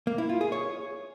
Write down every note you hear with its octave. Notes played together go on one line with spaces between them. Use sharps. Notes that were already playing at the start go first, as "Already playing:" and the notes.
A#3
E4
F4
G#4
C#5